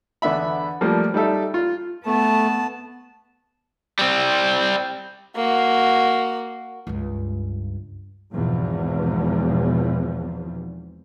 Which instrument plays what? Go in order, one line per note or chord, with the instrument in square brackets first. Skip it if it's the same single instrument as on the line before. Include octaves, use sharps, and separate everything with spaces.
[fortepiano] E2 D3 B3 E5 B5
F3 G3 A3 A#3
G3 D#4 A4 E5
F4
[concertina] A3 [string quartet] B3 A5
[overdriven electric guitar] G3 C4
[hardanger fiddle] A#3 F#4
[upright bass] C#2 G2
[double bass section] G#1 E2 B2 F3